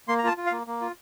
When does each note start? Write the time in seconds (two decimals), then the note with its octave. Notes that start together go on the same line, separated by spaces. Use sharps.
0.08 A#3 C6
0.19 A#5
0.23 F4 A5
0.37 F4
0.47 F5
0.52 A#3
0.67 A#3
0.81 F4